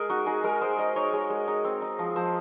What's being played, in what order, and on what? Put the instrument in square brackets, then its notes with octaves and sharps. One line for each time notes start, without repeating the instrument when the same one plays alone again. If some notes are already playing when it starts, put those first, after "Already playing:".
Already playing: [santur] G#3 G#4 A#4
D#4 F#4
D#4 G#4
G#3 A#4
G#3 C5
D#4 D#5
D#4 C#5
G#3
G#3
D#4
C4
D#4
F3
F3 C5